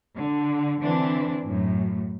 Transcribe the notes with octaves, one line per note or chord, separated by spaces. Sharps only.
D3
D3 E3 C4 D4
F#2 A2